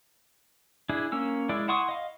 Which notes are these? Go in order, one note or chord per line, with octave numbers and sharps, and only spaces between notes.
D4 E4 G#4
A#3 C#4 E6
G#3 E4 D5
E4 F#5 C6 C#6 D#6
D#5 F5